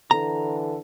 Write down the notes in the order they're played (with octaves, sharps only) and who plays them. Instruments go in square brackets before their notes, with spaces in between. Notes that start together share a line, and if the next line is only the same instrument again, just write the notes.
[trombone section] D3 E3 A4 [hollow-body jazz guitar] A#5